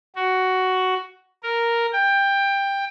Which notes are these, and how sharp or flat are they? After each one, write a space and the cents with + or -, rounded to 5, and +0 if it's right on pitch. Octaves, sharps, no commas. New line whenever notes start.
F#4 +10
A#4 +0
G5 +15